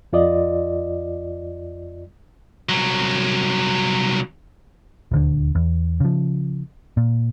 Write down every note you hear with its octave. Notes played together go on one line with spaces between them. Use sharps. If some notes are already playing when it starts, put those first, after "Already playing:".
F2 F4 D5 D#5
C2 F#3
D#1 D2 D3
E2
C#3 F3
A#2